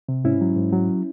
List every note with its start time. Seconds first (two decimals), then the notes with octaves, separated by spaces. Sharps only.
0.09 C3
0.24 G#2 C#4 E4
0.41 F#3
0.56 G#2
0.73 F#3